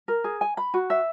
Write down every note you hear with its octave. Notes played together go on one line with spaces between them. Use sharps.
A#4
G#4
G#5
B5
F#4
E5